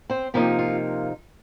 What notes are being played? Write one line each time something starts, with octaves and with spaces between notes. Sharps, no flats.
C4 C5
C3 F3 A#3 D#4 G4
F4